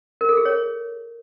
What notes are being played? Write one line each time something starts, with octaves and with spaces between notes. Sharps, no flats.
A#4
A4
G#4
C#5